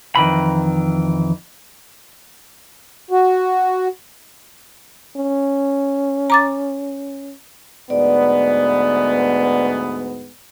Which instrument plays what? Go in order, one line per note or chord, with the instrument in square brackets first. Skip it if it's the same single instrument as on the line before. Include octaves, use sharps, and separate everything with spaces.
[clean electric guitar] F2 D#3 E3 B5
[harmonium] F#4
[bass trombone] C#4
[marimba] A#5 D6 A6
[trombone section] D2 G#2 B3 [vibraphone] D5